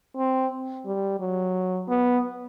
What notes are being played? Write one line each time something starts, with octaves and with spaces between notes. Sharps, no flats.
C4
G3
F#3
B3